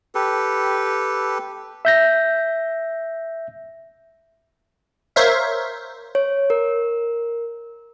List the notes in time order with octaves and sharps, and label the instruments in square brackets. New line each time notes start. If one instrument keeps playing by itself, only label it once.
[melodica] G4 A4 B4
[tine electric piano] E5 G6 A#6
[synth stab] A#4 C5 C#5 E5 F5
[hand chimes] C#5
A#4